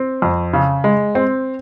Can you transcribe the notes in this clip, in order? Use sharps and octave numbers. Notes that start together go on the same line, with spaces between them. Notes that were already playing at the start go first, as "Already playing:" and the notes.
Already playing: C4
F2
C#3
G#3
C4